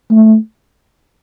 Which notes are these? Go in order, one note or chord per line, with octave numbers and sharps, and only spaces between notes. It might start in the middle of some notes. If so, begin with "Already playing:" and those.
A3